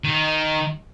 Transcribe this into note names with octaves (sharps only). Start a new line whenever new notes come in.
D#3